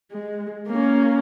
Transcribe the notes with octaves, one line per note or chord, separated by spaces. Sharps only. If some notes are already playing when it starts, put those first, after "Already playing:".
G#3
A#3 C#4